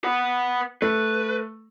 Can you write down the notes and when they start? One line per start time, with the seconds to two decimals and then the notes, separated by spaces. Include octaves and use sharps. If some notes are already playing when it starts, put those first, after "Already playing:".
0.04 B4 F#5
0.82 A3 B4